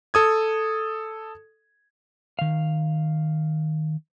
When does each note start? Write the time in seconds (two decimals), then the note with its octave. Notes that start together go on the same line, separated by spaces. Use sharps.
0.14 A4 D#6 G#6
2.39 D#3 F5